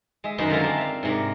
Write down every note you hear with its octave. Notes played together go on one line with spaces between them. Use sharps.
G#3 E5
F#2 D#3 F#4 C5 D#5 B5
D3 G#3 F4 E5 A#5
C4 D4
E5 F5
G#2 C3 A#4